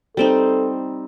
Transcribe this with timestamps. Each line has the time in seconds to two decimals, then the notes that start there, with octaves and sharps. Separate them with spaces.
0.17 G3 C4 D#4 A4